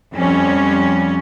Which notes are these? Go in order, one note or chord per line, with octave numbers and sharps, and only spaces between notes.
F2 G3 C#4